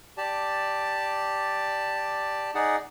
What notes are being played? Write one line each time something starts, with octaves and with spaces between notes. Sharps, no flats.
G4 D5 A5
D#4 G#4 D5 F#5